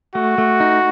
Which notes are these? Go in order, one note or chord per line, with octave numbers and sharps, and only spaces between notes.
A3 F#4
A3
D#4